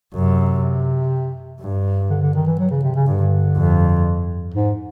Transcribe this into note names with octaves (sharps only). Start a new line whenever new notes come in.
F#2 C3
G2
D3
D3
D#3
E3
F#3
C#3
C3
C#3
G2 D3
F2
G#2